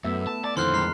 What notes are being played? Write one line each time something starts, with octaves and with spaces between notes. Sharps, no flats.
F#2 A3 B3 E5
A5
D5 A5
F2 D3 D#3 E4 C5 C6 F6 F#6
G#3 A#5 F6 C7